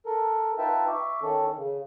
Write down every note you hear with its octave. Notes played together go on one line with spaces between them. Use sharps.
A4 A#4
D#4 F4 B4 E5 G5 A5
E5 C#6 D6
D#3 C#4 A4
C#3